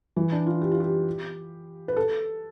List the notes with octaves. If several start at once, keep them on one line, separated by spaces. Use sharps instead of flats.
E3
D4
F4
G4
F4
G4
B4
A4